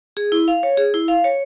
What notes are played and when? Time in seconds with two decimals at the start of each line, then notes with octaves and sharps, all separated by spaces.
0.17 G#4
0.32 E4
0.48 F5
0.63 C#5
0.77 G#4
0.94 E4
1.08 F5
1.24 C#5